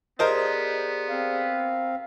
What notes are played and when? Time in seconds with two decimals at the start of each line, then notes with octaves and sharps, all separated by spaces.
0.19 B3 G4 G#4 A#4 C5 D5 D#5
1.09 C4 F5